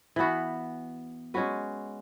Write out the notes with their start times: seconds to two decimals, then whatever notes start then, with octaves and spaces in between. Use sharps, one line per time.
0.16 E3 B3 F#4
1.34 G#3 C#4 F#4 B4